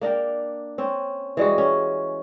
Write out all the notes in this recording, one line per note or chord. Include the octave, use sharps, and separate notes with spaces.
A#3 D4 A#4 G5
C4 C#4
E3 G3 G#3 F#4
C#4